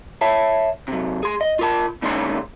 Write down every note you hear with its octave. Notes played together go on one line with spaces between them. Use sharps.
C#5 E5 A5
C3 F#3
G#4 C6
D#5
F4 A#4 A5
A#2 D3 D#3 G#3 C#4 C6